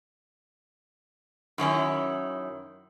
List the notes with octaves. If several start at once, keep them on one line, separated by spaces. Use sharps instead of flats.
F#2 D#3 C#4 E4